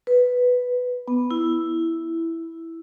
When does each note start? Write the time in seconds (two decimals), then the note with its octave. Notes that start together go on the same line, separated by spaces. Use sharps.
0.07 B4
1.08 B3
1.31 E4